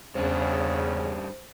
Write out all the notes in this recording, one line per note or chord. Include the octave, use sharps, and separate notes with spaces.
E2 G2 C#3 C#4 D4 C5